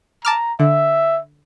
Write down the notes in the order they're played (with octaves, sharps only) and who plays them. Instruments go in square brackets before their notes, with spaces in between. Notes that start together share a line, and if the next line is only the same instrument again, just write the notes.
[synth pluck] A5 D6 F6 [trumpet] A#5
[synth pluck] D3 [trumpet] E5